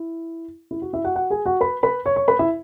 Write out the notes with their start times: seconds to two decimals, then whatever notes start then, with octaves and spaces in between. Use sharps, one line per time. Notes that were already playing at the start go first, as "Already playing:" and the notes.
Already playing: E4
0.71 E4
0.82 F#4
0.93 E4 E5
1.04 F#4 F#5
1.16 F#4 F#5
1.30 G#4 G#5
1.46 F#4 F#5
1.61 B4 B5
1.83 B4 B5
2.06 C#5 C#6
2.16 C#5 C#6
2.28 B4 B5
2.39 E4 E5